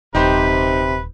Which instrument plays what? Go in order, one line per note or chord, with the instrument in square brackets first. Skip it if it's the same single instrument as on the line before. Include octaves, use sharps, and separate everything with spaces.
[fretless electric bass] D#1 [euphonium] C3 [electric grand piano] D#4 G4 C5 [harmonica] B4